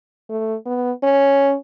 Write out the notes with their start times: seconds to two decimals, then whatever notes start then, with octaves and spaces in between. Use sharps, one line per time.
0.29 A3
0.66 B3
1.03 C#4